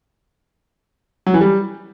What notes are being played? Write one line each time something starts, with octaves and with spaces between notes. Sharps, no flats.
F#3
E3
G3